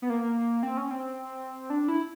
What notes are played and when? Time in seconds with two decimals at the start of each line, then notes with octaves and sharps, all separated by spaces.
0.02 B3
0.10 A#3
0.63 C4
0.77 C#4
0.91 C4
1.70 D4
1.88 E4